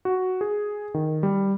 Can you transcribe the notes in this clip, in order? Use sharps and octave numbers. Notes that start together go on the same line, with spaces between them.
F#4
G#4
D#3
G3